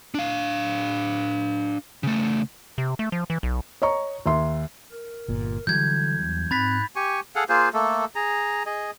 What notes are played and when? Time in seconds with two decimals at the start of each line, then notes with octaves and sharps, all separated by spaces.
0.14 D4 F5
2.03 C#3 A3
2.78 C3
2.99 A3
3.12 F3
3.30 E3
3.43 B1
3.82 C#5 D#5 A#5 C#6
4.26 D#2 E5 C6
4.92 A#4
5.28 G1 A#2
5.67 D3 E3 F#3 G3 G6 G#6
6.17 E2
6.51 G#2 C4 B5 F#6 A6 B6
6.96 G4 G#5 C#6
7.35 G#4 A4 F5 F#5
7.49 A#3 F4 G#4 C5
7.74 A3 A#3 A4
8.15 G#4 A#5
8.66 G#4 D#5